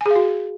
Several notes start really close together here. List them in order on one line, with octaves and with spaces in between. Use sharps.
G#5 G#4 F5 F#4